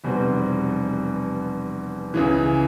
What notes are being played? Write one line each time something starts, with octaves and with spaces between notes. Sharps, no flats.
F1 E2 B2 G3 C4
C#2 C#3 E3